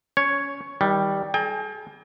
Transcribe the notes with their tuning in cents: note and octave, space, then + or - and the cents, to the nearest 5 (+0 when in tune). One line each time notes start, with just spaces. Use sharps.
C#4 +20 C#5 +0
D#3 +35 G3 +0
G#4 +45 G5 +40 A#5 +0